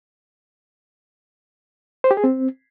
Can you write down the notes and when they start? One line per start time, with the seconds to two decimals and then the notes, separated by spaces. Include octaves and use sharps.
2.04 C5
2.11 G4
2.17 G#4
2.24 C4